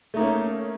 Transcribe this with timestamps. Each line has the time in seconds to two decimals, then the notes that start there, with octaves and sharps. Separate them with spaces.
0.14 A3
0.17 D#4
0.19 A#3
0.22 C#4